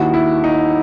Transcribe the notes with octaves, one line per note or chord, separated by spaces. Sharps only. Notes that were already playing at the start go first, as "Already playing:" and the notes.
Already playing: D#2 D#3 E4 F#4
E4
D#4